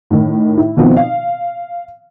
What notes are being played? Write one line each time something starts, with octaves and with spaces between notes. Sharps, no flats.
A2 D#3
E4
B2 D#3 F3 B3 C4
F5